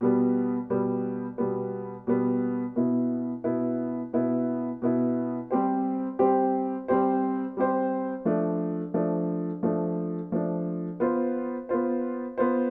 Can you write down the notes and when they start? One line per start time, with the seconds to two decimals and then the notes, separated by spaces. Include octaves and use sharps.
0.01 B2 G3 B3
0.70 B2 G3 B3
1.38 B2 G3 B3
2.07 B2 G3 B3
2.76 B2 B3 E4
3.44 B2 B3 E4
4.13 B2 B3 E4
4.82 B2 B3 E4
5.51 G3 C4 G4 C5
6.19 G3 C4 G4 C5
6.88 G3 C4 G4 C5
7.57 G3 C4 G4 C5
8.25 F3 A3 D4
8.94 F3 A3 D4
9.63 F3 A3 D4
10.32 F3 A3 D4
11.00 B3 F4 C5
11.69 B3 F4 C5
12.38 B3 F4 C5